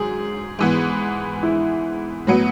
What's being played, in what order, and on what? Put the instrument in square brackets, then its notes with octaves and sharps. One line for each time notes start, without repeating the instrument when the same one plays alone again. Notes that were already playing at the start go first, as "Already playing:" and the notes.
Already playing: [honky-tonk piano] G#2 F#3 [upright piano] G#4
[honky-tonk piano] G#2 E3 B3
[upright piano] E4
[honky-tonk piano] A2 F#3 B3